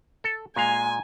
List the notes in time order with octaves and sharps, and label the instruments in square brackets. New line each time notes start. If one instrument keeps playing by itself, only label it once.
[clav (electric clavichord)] A4
[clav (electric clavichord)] A#2 G#3 F5 [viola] G#5